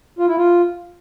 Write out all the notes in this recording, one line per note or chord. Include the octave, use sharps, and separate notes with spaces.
F4
E4
F4